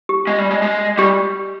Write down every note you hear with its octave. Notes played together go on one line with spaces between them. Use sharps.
G4
G#3
G3
G#3
G#3
G3 G4